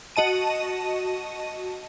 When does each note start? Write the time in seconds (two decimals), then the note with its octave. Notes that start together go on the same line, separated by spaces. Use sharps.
0.16 F#4 D#5 A5 D#7